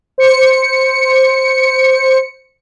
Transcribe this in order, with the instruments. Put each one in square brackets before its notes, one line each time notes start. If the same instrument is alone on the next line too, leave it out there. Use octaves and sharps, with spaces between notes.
[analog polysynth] C5 C#7